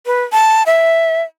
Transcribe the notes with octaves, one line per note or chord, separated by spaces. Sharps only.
B4
A5
E5